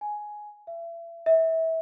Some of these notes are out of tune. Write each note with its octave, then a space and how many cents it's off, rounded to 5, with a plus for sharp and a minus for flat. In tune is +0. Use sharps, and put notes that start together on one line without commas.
G#5 +10
E5 +35
E5 -25